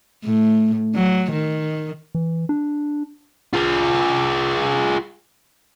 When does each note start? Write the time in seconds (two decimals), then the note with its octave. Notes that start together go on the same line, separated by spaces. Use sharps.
0.24 A2
0.95 F#3
1.32 D#3
2.15 E3
2.49 D4
3.54 F4 G#4